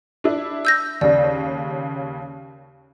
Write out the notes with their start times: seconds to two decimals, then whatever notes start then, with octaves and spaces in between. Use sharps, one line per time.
0.24 D4 E4
0.65 E6 G6 A#6
1.01 D#2 C#3 D5